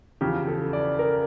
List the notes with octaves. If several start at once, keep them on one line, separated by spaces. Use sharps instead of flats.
E2 C#3 F3 G4
A4
D5
A#4